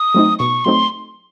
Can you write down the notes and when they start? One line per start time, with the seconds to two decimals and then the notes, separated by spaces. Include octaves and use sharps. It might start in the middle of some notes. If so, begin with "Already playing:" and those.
Already playing: D#6
0.14 F#3 A3 C4 D#4
0.39 B2 C#6
0.65 F#3 A3 C4 D#4 C6